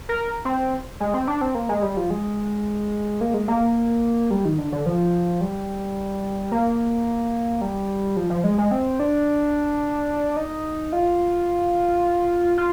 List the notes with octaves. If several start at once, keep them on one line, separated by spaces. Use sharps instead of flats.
A#4
C4
G#3
C4
D4
C4
A#3
G#3
G3
F3
G#3
A#3
G#3
A#3
G3
D#3
D3
D3
F3
G3
A#3
G3
F3
F3
G#3
G#3
C4
D4
D#4
F4
F4